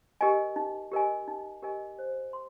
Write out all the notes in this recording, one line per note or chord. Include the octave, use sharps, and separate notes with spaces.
G4 A#4 D#5 G#5
D#4
G4 A#4 D#5 G#5
D#4
G4 A#4 D#5 G#5
C5
C6